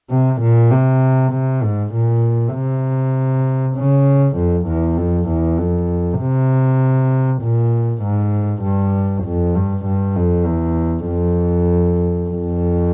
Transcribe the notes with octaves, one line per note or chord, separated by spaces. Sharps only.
C3
A#2
C3
C3
G#2
A#2
C3
C#3
F2
E2
F2
E2
F2
C3
A#2
G#2
G2
F2
G2
G2
F2
E2
F2
F2